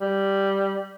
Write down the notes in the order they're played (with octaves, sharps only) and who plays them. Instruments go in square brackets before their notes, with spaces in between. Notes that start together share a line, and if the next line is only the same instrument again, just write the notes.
[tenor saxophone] G3